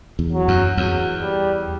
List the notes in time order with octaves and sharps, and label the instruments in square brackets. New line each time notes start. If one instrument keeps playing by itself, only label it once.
[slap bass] E2
[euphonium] F#3
[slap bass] F#2
[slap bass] E2 [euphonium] F#3
[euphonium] G3